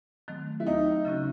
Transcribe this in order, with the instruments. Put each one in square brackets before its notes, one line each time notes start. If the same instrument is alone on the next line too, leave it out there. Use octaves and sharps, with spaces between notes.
[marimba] D#3 F#3 A3 C4
[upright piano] E4
[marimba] D#2 [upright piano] D#4
[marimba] C#3 F#3 C#4 F#4